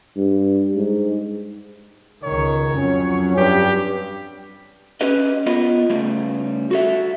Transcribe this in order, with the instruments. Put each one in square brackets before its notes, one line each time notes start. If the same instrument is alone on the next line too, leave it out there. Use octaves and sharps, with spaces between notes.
[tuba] G2
G#2
[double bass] C#2 D#3 [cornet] C#5
[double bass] F2 F#3 [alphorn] C#4
[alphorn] G2 [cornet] G4
[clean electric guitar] C#4 G4 B4 D#5
B3 F4 A#4 D#5
C#3 G3 A3
F#4 A4 E5